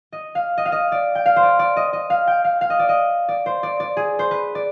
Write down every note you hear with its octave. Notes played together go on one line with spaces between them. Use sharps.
D#5
F5
D#5
F5
D#5
D5
G5
F5
C5
D5
D5
D#5
D#5
F5
G5
F5
F5
D#5
D5
D#5
D5
C5
D5
D5
G#4
C5
B4
D5